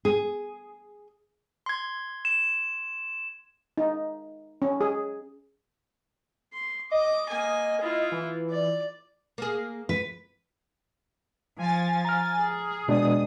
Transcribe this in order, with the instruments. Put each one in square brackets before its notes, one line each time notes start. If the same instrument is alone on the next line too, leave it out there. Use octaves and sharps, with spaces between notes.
[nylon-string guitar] G#4
[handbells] C6 G#6
[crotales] E7
[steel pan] D#4
C#4
G#4
[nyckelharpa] C6
[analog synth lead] D#5 [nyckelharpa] D6
[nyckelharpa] A#3 G#5
E4 F4
[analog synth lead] E3
[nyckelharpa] D5
[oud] A#3 G#4
[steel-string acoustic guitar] B4
[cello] F3 [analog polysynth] G#5 A6
[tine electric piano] A#5 F6
[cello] G#4
[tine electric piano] B2 G#3 D4 [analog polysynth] D#6